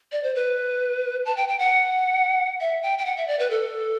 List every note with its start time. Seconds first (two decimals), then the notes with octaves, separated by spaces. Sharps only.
0.12 D5
0.23 C5
0.35 B4
1.25 A5
1.37 G5
1.48 G5
1.59 F#5
2.61 E5
2.83 G5
2.98 G5
3.05 F#5
3.17 E5
3.28 D5
3.39 B4
3.50 A4